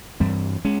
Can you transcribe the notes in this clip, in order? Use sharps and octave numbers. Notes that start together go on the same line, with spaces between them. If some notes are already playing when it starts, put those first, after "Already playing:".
G2 E3 G3 C4
G#3 C#4